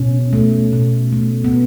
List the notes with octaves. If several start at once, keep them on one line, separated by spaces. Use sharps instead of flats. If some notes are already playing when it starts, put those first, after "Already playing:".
Already playing: B2 C#4
A3
B2
A3
B3